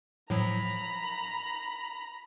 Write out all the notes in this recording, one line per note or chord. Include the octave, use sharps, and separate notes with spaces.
A2 F3 F#3 A#5 B5